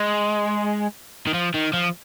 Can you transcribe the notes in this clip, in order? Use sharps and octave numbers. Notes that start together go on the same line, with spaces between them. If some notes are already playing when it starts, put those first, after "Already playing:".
Already playing: G#3
D#3
F3
D#3
F3